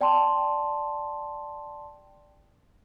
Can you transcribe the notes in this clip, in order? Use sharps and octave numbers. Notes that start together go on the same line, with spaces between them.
D5 G5 A5 C6